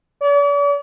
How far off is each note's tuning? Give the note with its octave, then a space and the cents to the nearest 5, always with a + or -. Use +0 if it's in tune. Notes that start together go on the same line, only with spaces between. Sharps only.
D5 -45